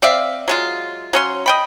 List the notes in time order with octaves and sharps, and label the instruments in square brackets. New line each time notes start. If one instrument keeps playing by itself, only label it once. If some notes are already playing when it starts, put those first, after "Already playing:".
[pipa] C4 D5 E5 F5
F#3 G#3 F4
F#3 C#4 C6
D#5 G5 B5